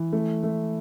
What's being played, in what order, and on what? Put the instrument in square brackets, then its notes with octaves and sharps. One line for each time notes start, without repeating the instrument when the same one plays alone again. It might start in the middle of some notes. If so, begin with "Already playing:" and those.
Already playing: [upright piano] E3
A3
A3